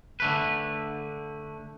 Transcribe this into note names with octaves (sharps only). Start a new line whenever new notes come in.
D3 A3 B4